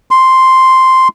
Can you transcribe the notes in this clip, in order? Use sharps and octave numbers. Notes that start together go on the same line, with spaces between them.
C6